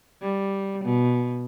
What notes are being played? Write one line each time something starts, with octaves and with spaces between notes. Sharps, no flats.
G3
B2